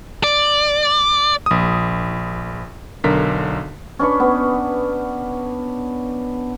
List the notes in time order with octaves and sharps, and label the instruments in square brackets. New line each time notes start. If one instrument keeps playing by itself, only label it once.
[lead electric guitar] D5
[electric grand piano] A#1 D#6
B1 D3 A#4 B6
[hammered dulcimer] C#4 D4 B4 C#6
B3